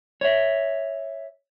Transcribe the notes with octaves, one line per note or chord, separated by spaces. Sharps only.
C#5 E5